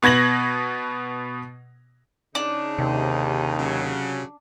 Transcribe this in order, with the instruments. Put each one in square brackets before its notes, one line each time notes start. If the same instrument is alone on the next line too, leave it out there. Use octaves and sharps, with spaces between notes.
[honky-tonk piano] B2 B3 G#6 A#6 F#7
[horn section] C#3 D#4 [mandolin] D4
[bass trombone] D#2 [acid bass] C3
[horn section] C#3 F#3